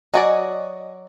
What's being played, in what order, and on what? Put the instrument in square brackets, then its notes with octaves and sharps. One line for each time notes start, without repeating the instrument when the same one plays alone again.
[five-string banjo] F#3 F#4 D5 [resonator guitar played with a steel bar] D#5 G#5